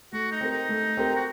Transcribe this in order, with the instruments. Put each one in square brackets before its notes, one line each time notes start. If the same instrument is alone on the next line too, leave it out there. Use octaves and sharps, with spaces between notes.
[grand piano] A3 [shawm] F#4
[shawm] D#4
[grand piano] C4 G4 A#4
[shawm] D#4
[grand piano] A3
C4 G4 A#4
[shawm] F#4